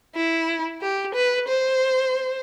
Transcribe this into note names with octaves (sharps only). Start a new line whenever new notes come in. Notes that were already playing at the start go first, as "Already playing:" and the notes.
E4
G4
B4
C5